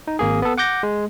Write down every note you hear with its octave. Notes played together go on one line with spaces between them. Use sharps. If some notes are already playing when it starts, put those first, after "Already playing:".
D#4
G#1 A#3 G#4
B3 A4
F#5 D6 G6 A#6
G#3